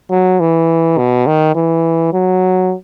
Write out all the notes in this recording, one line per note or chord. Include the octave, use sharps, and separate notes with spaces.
F#3
E3
B2
D#3
E3
F#3